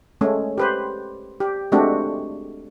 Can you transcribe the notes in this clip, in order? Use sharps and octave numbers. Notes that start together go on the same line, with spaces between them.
G#3 A3 C#4
G4 B4 C5
G4
G#3 A3 C4 D4 F#4 G4